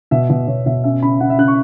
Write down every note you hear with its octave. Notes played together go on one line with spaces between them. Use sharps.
B2 E5
B2 E5
B2 C#5
B2 E5
C#4 E5
C#3 B5
C#3 F#5
E5
C#3 F#6
C#6